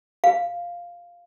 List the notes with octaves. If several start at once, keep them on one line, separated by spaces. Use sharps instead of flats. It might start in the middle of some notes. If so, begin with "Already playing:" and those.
F5